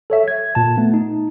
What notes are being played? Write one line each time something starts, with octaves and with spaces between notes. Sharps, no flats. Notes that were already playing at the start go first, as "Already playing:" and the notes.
A4 C#5 E5
G#6
A#2 A5
A3 B3
D#4